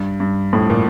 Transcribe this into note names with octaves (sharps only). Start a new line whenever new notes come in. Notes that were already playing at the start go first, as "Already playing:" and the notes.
Already playing: G2
G2
F2 A2
A#2